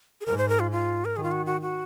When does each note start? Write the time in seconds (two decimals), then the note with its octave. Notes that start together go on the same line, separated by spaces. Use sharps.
0.21 G#4
0.26 G#2 A#4
0.38 C5
0.49 A#4
0.60 F4
0.71 F4
1.05 A#4
1.16 D#3 G#4
1.23 F4
1.31 F#4
1.46 F#4
1.61 F#4